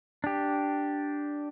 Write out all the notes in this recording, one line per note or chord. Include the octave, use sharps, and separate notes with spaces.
D4 G4